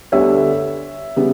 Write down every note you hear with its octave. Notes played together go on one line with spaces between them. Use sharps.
D2 D3 G3 B3 C#5 E5
C#3 G3 B3